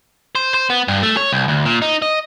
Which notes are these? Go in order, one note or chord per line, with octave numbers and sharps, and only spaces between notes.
C5
C5
B3
G2
A3
C#5
C2
D2
A#2
D#4
D#5